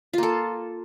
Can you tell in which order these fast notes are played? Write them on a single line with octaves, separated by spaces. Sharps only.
F4 A#3 A4